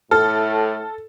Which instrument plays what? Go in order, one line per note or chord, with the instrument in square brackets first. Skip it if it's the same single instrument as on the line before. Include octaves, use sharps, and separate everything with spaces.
[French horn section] A2 [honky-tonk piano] A4 [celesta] F6